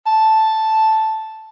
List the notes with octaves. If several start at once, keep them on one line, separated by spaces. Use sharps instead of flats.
A5